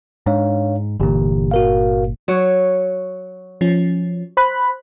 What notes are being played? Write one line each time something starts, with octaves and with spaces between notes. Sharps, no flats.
G#2 D4 C#5 F5
G1 A#2 D3 E3 G4
F#4 A#4 F5
F#3 C#5
F3 C#4
C5 B5 F#6